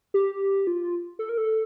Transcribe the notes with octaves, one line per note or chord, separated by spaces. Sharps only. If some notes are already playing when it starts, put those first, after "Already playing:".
G4
F4
A4
A#4
A4